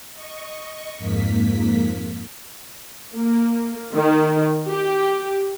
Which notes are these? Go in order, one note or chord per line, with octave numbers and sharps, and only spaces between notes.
D#5 C#6
F2 G#2 A#3 B6
A#3
D#3
G4